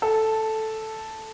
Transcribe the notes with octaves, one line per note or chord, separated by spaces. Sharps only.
A4